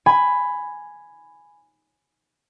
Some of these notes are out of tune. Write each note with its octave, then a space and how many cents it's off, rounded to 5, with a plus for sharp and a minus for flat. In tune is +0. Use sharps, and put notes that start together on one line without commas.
G#5 +0 B5 +10